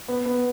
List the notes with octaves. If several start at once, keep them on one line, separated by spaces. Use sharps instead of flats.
B3
B3